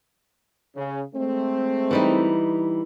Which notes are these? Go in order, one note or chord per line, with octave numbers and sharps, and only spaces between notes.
C#3
G#3 A3 C4
E3 G3 D#4